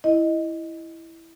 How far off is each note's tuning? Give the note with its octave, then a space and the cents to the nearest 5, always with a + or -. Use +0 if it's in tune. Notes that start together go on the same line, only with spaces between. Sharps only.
E4 +0 D#5 +0